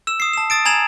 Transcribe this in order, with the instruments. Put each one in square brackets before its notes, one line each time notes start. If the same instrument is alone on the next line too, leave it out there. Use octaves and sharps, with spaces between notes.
[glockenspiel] E6 E7
D#6 C7
A5 E7
D#6 A6 D7
G#5 A#5 G#6 E7 F#7